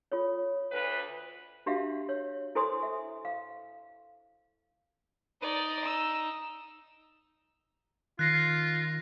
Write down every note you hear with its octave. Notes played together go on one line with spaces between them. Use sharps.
F4 A4 C#5
D2 B4
D4 F#4 G4 E5 F5
C#5
E4 A4 C5 G#5 C6 D#6
E5
F5
D#4 D5
E6
D#3 F4 F#6 A#6 C7